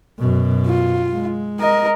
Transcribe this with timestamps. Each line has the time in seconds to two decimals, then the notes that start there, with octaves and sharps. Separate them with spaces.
0.18 F#2 B2
0.66 F4
1.13 G#3
1.60 A#4 D#5